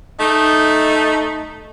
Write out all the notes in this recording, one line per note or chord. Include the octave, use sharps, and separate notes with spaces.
A3 D#4